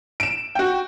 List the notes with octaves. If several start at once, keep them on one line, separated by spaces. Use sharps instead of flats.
D7 E7
F#4 G5